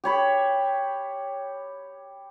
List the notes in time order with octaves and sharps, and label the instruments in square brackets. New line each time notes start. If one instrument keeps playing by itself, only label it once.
[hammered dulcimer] G4 C#5 B5